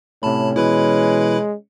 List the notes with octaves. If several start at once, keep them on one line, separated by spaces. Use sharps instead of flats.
A2 C3 A3 C#4 A5 B5
B2 E3 G#3 E4 B4 B5